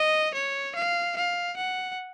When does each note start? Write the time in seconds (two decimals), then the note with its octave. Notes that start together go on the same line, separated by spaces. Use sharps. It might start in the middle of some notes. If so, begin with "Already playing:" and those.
Already playing: D#5
0.34 C#5
0.75 F5
1.17 F5
1.57 F#5